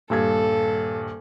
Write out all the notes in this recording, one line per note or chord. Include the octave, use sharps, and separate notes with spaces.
D#1 G2 A4 G#6